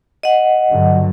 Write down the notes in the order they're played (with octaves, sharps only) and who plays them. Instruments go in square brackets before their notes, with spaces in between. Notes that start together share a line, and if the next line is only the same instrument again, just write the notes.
[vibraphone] D#5 F#5
[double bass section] G2 D3 F#3